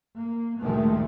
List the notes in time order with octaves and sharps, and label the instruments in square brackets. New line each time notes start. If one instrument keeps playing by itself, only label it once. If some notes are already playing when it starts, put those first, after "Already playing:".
[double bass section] A#3
D2 A#2 D#3 F3 G#3 A3